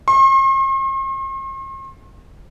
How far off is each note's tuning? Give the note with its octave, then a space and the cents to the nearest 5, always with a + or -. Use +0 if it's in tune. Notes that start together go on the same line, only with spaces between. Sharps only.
C6 +40